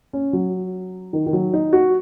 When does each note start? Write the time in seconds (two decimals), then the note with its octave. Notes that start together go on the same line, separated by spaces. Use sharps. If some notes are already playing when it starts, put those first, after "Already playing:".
0.13 C#4
0.33 F#3
1.13 D#3
1.26 D#3
1.33 F#3
1.53 D#4
1.73 F#4